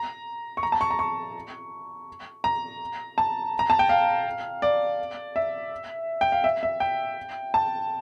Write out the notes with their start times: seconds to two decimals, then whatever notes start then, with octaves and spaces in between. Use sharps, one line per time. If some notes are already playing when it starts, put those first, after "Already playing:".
Already playing: A#5
0.57 C#6
0.63 A#5
0.72 A5
0.81 C#6
0.91 A#5
0.99 C#6
2.44 A#5
3.18 A5
3.59 A#5
3.70 A5
3.79 G5
3.89 F5
4.62 D5
5.36 E5
6.21 G5
6.32 F5
6.44 E5
6.63 E5
6.80 G5
7.54 A5